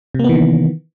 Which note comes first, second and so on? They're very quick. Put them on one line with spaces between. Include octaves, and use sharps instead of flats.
C3 A#3 B3 E3 D#3